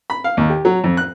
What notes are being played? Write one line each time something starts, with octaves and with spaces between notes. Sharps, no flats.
B5
F5
D#2
G4
F#3
F2
F#6